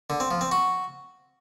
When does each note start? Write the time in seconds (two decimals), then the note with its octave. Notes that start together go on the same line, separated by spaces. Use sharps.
0.10 D3
0.20 C4
0.31 F3
0.41 C4
0.52 F#4